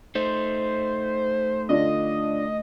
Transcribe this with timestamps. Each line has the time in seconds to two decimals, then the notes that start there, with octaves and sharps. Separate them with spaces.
0.15 A3 D#4 C5
1.69 D3 D4 F4 D#5